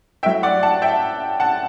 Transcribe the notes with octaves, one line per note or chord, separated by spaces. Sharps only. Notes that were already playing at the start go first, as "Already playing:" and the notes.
F#3 A3 E4 E5 G5
D5 F#5
F#5 A5
E5 G5
F#5 A5